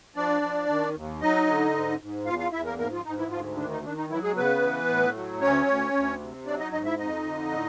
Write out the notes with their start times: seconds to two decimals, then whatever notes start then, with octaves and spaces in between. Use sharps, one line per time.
0.16 F3 D4 D5
0.42 F3
0.68 D#3
0.94 D#2
1.20 F#3 D#4 D#5
1.47 D3
1.74 G#2
2.00 G#2
2.26 E2 F4 F5
2.39 F4 F5
2.52 E2 E4 E5
2.65 A#3 A#4
2.78 G#2 A#3 A#4
2.92 F3 F4
3.04 G#2 D#4
3.18 E3 E4
3.31 D2 F3 F4
3.57 D#3 D4
3.70 D#4
3.83 D#3 D4
3.96 D#4
4.10 E3 F#3 E4
4.23 G#3 G#4
4.36 C#3 B3 B4
4.62 E3
4.89 A2
5.14 F#3
5.41 D2 C#4 C#5
5.67 D2
5.93 D2
6.20 C3
6.46 F#3 D4 D5
6.59 D#4 D#5
6.72 G#2 D#4 D#5
6.85 E4 E5
6.98 F2 D#4 D#5
7.25 D3
7.52 A2